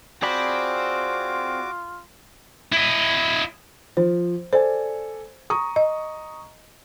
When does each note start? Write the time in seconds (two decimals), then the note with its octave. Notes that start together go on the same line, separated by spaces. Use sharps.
0.22 C4 F4 F#4 G#4 D5 B5 D6
2.73 E4 D#5
3.97 F3 C5
4.53 A4 C5 D5 G#5
5.50 A#5 C#6 D#6
5.76 D#5